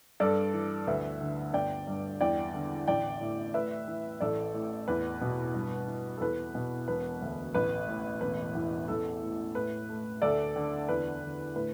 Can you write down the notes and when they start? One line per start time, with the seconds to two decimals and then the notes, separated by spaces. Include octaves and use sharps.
0.20 G2 A4 D5
0.53 E3
0.87 D2 B4 E5
1.21 D3
1.53 G1 D5 G5
1.88 G2
2.21 E2 D5 G5
2.54 D3
2.88 A1 D5 G5
3.21 A2
3.54 A2 B4 E5
3.88 E3
4.20 A1 A4 D5
4.54 A2
4.88 E2 B4
5.21 B2
5.54 G2
5.87 E3
6.17 A4
6.21 E2 B4
6.55 B2
6.88 E1 B4
7.22 D2
7.55 A1 B4
7.88 A2
8.21 E1 B4
8.55 E2
8.88 A1 A4
9.22 A2
9.55 A2 B4
9.89 A3
10.22 D2 A4 D5
10.56 D3
10.89 E2 B4
11.22 D3
11.55 A2 B4